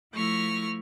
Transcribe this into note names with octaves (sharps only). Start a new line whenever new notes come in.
F3 A3 E4 C#6 F6 A#6